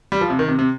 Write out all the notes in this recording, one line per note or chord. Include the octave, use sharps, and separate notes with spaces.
G3
F3
C3
D#3
C3
C3